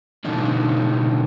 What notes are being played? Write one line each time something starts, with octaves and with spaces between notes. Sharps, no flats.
G2 B2 D3 E3 D4 D#4